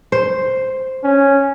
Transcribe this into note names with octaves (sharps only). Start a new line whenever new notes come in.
C5
C#4